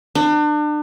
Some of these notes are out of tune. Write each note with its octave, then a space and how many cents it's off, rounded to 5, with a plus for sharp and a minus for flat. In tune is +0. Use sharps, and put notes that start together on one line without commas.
D4 +35